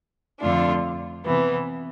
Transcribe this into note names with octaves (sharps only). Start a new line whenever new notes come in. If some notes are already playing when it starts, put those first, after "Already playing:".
F2 D3 A3 D4 F4
C3 E3 B3